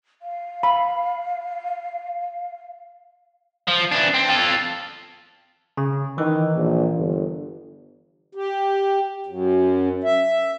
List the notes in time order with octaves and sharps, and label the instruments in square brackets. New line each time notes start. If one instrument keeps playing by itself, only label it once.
[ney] F5
[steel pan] B5
[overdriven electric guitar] F3
E3 D4
C4
F4 A4
[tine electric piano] C#3
[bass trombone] D#3 [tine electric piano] E3
[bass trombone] A#1
G1
[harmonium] G4
F#2
E5